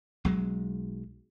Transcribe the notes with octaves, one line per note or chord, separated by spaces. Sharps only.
B1 F#3 G#3